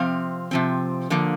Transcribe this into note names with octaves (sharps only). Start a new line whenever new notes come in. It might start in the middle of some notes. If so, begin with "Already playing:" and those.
Already playing: C3 F3 C4 F5
C3 F3 C4
D3 F3 A#3